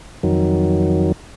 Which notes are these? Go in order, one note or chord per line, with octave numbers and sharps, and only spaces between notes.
F2 D#3 F#3